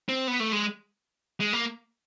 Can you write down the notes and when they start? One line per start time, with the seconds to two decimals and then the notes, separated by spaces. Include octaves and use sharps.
0.09 C4
0.27 B3
0.40 A3
0.52 G#3
1.40 G#3
1.53 A#3